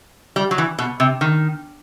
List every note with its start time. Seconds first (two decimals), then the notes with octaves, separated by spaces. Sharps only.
0.36 G3
0.51 F#3
0.58 E3
0.79 B2
1.00 C3
1.21 D#3